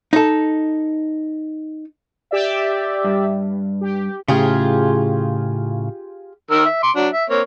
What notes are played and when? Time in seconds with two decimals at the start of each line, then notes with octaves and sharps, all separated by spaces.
0.13 D#4 A4
2.31 G4 D5 E5
3.04 G2
3.81 G4
4.28 A2 C#3 F4 G4 G#4
6.51 D#3 A#4 E6
6.66 E5
6.83 C6 D6
6.96 F#3 D4
7.13 E5
7.30 A#3 C4 C#5